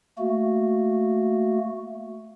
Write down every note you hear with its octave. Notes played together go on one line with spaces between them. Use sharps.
A3 A#3 F#4